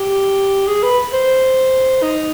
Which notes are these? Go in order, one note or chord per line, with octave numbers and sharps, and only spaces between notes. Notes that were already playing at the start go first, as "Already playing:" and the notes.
Already playing: G4
G#4
B4
C5
D#4